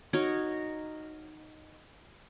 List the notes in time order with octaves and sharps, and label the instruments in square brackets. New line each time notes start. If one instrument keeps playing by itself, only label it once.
[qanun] D#4 F#4 A#4 C#5